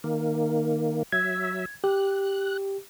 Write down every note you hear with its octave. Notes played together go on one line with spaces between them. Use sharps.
D#3 A#3
F#3 E5 G#6
G4 F#6